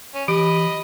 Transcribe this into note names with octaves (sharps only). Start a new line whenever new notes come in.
C#4
E3 G4 D#5 B5